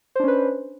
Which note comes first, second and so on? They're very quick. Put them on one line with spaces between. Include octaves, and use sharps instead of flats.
C5 D4 C#4 B4